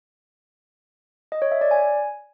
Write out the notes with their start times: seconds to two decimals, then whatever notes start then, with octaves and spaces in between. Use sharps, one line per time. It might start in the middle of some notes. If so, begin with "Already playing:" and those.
1.32 D#5
1.42 C#5
1.52 E5
1.61 D5
1.71 G#5